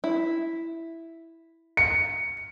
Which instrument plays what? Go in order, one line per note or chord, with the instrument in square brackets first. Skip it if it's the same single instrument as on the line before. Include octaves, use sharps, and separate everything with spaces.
[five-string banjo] E4
[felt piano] C#7